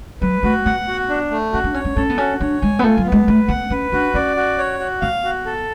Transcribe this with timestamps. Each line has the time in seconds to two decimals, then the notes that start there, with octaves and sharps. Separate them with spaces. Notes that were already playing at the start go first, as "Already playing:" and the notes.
0.21 F#3 B4
0.43 A3 F#4
0.65 B3 F#5
0.88 F#4
1.09 D4
1.31 A3
1.53 C#4 F#4
1.64 D4
1.74 C#4 C#5
1.85 C#4
1.96 C#4 A4
2.10 B3
2.18 C#4 F#4
2.41 D4 C#5
2.61 G#3 G#5
2.79 B3
2.83 A3 F4
2.98 F#3
3.05 B3
3.12 G#3
3.27 A3 B4
3.48 B3 F#5
3.70 C#4 B4
3.92 D4 F#4
4.14 C#4 D5
4.36 F#4
4.58 C#5
4.80 F#4
5.01 B3 F5
5.24 F#4
5.46 A4